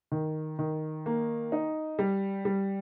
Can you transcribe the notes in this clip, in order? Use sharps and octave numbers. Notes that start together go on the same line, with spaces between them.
D#3
D#3
A#3
D#4
G3
G3